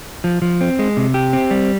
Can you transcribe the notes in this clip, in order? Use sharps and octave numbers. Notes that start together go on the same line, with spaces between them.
F3
F3
C4
G#3
C3
G4
C4
G3